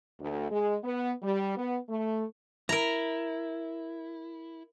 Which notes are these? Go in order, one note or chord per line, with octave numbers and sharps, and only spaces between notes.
D2
G#3
B3
G3
B3
A3
E4 A#4 A#5